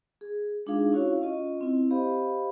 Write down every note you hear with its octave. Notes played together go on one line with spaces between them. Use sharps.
G#4
G#3 D4 D#4 F4 G#4 F5
C#4 E4 F#4 C#5 F5
C#4 F4 D#5
C4 E4
G4 C5 D#5 F5 B5